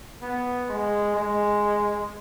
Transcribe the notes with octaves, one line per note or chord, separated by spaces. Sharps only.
B3
G#3
G#3